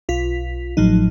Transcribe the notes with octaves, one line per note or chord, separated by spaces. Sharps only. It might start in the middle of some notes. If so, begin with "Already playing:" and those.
B1 F4 B6
A1 A2 F3 F#3 D#4